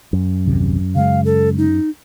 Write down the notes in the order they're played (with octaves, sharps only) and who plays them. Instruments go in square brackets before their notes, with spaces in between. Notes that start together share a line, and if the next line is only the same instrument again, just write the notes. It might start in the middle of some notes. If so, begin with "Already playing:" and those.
[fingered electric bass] F#2
[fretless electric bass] A#1 D#2 C3
[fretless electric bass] C#3 G#3 [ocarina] F5
[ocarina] A4
D#4